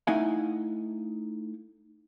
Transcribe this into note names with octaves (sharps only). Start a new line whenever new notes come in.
A3 D#4 E4 F5 F#5 G#5